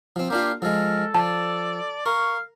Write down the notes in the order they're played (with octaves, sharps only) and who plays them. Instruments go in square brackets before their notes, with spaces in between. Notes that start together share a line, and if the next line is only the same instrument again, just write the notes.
[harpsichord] F3 C4
[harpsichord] A#3 D4 F4 [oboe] G4 [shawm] F5
[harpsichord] F3 G#3 [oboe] A4 [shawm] A#4
[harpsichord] F3 [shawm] D5 [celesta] A5
[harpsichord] A#4 [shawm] F5 [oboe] C#6